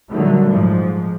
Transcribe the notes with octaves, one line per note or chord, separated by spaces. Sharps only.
A#2 D3 D#3 F#3 G3 A3
G#2 F3